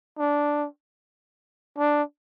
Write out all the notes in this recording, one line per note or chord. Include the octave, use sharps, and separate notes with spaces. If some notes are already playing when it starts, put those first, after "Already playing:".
D4
D4